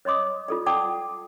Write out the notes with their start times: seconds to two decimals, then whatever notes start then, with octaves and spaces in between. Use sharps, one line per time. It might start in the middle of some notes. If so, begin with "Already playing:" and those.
0.05 C#5 D#5 C6 D6 D#6
0.48 F4 A4 D5
0.66 D5 F#5 G5 A5 D6 D#6
0.81 D#6